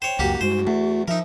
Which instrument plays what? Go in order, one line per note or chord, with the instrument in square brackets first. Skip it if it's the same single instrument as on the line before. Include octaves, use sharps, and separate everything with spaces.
[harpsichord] C5 C#5 [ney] G5
[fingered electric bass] C#2 F#2 [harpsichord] A#3 F#4 G4
[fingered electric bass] G2 G#3 [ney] F#4 [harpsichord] C5
[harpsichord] E2 [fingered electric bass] A3
[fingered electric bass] F3 [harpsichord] D#4 A#4 [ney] E5